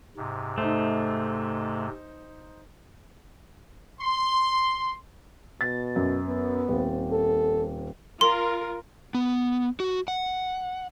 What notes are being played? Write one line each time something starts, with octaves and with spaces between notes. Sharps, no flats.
G#2 C3
A3 D#4 C5
C6
B2 A6
F#2
B3
D#1 C4
A4
F4 A#4 C6
B3
F#4
F#5